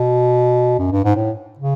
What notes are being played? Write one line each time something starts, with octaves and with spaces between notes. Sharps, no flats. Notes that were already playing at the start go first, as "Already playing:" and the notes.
Already playing: B2
F#2
G2
G#2
A2
C#3